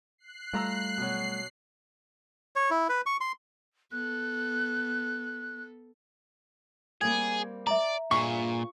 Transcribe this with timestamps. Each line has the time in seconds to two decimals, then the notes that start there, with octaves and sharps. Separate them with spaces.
0.18 F#6 C7
0.53 G3 A3 F4 A#5 E6
0.98 B2 F#3 C7
2.56 C#5
2.70 E4
2.89 B4
3.06 C#6
3.21 C6
3.92 B3 A4 F#6
7.01 G3 A#3 C4 G#4 G#6
7.67 D5 E5 A#5
8.11 G2 A#2 F4 G#4 C#6